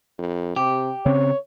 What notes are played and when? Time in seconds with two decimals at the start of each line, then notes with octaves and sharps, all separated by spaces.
0.19 F2
0.56 C3 G4
1.06 C#3 C4 C#5